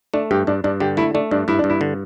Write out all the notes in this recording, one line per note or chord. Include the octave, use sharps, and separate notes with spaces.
A3 D4
G2 G4
G2 D4
G2 D4
D3 G4
A3 E4
A3 D4
G2 D4
G2 E4
D4
G2
E4
D3